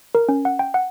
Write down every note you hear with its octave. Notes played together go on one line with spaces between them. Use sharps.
A#4
C#4
F#5
G5
F#5